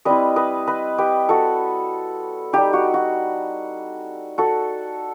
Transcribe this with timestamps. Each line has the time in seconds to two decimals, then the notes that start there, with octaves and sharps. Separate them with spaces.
0.05 G3 C4 E4 B4 D#5
0.36 B4 D#5
0.67 B4 D#5
0.98 G4 B4
1.29 F#4 A4
2.53 G3 D#4 G4
2.73 F#4
2.94 F#4
4.38 F#4 A4